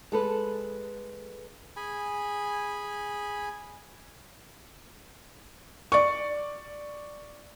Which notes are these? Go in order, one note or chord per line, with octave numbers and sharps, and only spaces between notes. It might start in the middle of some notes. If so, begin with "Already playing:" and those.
G#3 A4 B4
G#4 G#5 B5
D5 C#6